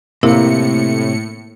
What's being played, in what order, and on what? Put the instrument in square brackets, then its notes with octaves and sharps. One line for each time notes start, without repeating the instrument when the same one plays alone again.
[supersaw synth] A2 C#7 [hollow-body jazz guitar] C3 [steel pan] A#3 [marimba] E4